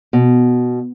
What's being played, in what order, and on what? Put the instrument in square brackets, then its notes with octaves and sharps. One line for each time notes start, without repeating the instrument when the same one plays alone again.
[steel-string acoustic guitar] B2